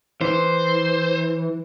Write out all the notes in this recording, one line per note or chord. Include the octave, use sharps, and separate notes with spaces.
E3 C5